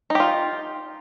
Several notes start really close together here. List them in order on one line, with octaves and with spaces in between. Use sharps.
D#4 G4 F4